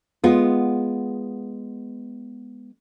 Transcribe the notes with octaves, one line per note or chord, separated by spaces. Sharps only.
G#3 B3 F4